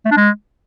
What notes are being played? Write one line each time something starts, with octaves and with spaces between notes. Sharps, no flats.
A3
D4
G#3